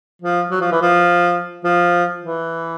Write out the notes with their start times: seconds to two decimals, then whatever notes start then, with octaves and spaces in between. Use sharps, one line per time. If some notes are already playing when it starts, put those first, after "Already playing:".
0.22 F3
0.51 F#3
0.61 F3
0.72 E3
0.82 F3
1.64 F3
2.22 E3